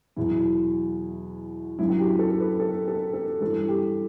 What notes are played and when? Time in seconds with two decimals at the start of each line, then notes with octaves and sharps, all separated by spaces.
0.16 E2 B2 F#3 E4
1.79 F#2 D3 F#3 E4
1.90 F#4
1.99 G4
2.19 A4
2.40 B4
2.60 A4
2.88 A4
3.14 A4
3.41 G2 E3 A4
3.68 G4